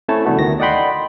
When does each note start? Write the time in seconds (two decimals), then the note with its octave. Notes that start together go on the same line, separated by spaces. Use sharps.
0.09 A3 C4 C#4 E4 C#5 A5
0.25 C3 E3 G3 A3 B3 F#4
0.38 D2 D#3 A#6
0.60 D5 D#5 F#5 G5 B5 C6